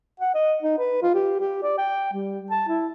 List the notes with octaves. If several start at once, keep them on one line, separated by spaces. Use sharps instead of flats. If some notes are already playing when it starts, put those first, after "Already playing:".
F#5
D#5
D#4
B4
F4
G4
G4
D5
G5
G3
A5
E4